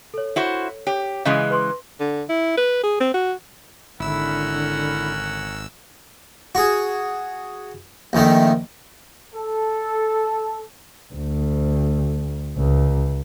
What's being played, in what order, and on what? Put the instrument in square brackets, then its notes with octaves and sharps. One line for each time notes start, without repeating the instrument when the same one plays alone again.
[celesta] A4 C#5
[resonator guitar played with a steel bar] E4 F#4 C5
[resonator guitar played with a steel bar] G4 [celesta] C#5
[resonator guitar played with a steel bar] C#3 E3 G#3 [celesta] D#5 F5
[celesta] B4 C6 D6
[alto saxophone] D3
E4
B4
G#4
C4
F#4
[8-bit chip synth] G#1 E6 [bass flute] D3 [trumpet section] C#4 A#4 F#5 [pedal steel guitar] E4
[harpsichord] F#4 G#4
A#1 D#3 A3
[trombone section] A4
[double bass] D2
C#2